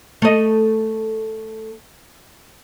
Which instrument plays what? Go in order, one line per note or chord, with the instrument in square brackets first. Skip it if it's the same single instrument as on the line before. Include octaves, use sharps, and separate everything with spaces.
[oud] A3 D#5